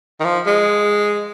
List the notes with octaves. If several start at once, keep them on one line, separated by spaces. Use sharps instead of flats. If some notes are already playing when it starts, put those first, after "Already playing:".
D#3
F3
G#3